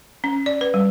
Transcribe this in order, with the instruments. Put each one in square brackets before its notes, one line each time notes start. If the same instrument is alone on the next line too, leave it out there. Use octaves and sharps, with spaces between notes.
[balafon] C#4
D5
B4
G3